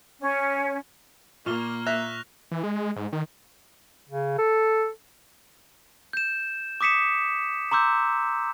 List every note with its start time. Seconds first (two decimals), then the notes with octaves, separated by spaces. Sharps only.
0.20 C#4
1.46 A#2 A#3 C#6 F6 G7
1.87 E5 F#6 A#6 F7
2.52 E3
2.63 G#3
2.96 G#2
3.13 D#3
4.09 C#3
4.38 A4
6.13 G6 E7
6.81 D6 D#6 B6 C#7 E7
7.71 A#5 C6 D6 E6 G6